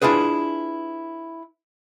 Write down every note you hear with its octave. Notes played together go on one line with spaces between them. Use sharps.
D4 E4 F4 G#4 B4